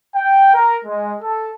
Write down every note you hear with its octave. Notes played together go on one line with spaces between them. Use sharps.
G5
A#4
G#3
A4